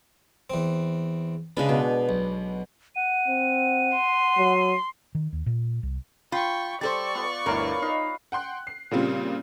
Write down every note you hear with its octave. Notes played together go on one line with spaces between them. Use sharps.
E2 C4
C#3 G#3 D4 B4
B2
B1
F#5 D#7
C4
C6
F#3
D#3
D#2
A#2
C2
F4 G5 B5 C#6
G3 A4 C5 D5 C#6 A6
B3 F4
G1 D2 E4 A#4 B4 C#5 F5
D#4 D#5 F5 B5
F#5 G5 C6 F#6
C7
A#2 C#3 G3 C4 F4